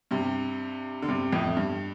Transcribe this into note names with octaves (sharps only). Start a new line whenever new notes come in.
G2 C3
D3
G2 C3
F2 A2
G2